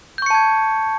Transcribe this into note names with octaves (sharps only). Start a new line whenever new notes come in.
A5 C#6 G6 G#6 C#7